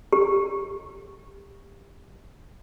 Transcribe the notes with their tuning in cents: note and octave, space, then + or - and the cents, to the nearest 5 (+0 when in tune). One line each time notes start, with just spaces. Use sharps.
G4 +20